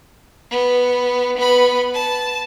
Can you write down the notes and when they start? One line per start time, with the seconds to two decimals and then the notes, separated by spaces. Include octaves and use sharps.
0.51 B3
1.37 B3 B5
1.95 A5